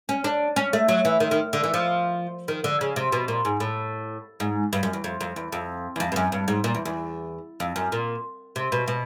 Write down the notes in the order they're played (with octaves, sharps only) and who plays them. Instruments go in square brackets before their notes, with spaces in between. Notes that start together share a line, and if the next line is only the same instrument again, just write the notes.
[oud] C#4
D4
C#4
A3
F#3
E3
D#3
D#3
D3
E3
F3
D#3
D3
C#3
C3
B2
A#2
G#2
A2
G#2
G2
F#2
E2
F2
F2
E2
F2
E2
F2
G2
F#2
G2
G#2
A#2
E2
E2
F2
F#2
A#2
C3
B2
B2